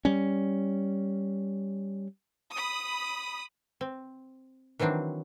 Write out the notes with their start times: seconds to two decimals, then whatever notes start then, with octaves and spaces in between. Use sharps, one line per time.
0.05 G3 C#4
2.52 B5 D#6
3.81 C4
4.79 D#3 E3 F#3 C4 D4